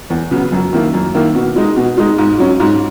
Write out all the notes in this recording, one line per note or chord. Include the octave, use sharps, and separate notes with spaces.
E2
C#3 F#3 B3
F#2
D#3 A#3 E4
F#2
D#3 A#3 E4
B2
G#3 D#4
B2
G#3 D#4
G#2
F#3 C#4
G#2